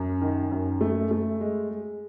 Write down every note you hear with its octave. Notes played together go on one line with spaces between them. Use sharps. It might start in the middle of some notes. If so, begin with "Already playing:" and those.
Already playing: F#2
D#3
F#2
A3
A3
G#3
G#3